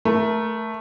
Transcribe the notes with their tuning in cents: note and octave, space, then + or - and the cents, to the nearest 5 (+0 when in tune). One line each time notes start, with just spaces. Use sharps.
A3 +0 A#4 +20